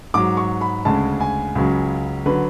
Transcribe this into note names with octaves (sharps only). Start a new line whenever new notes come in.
G#2 F#3 D6
C#6
B5
D2 C#3 G#3 A5
G#5
C#2 C#3 F#3
D3 F#3 B4